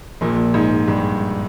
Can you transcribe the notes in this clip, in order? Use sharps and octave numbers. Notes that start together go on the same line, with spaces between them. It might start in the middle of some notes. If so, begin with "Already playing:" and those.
A#1 A#2
G#2
G2